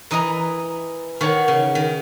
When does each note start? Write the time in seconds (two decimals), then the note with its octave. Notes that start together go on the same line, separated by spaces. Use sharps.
0.11 E3 A#4 D#5 A#5
1.21 D#3 C#5 F#5 C#6
1.48 C#3
1.75 D#3